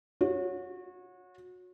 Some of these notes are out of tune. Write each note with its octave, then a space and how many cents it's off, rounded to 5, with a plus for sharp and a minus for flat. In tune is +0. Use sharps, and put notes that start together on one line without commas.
F#4 -30 C#5 +0